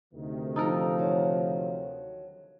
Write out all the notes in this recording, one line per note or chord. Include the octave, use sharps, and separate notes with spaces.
D2 C3 D#3
F3 D#4 A4 A#4
F#3